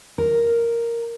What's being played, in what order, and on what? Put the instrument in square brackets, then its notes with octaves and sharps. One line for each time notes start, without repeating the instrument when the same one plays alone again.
[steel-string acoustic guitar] A#4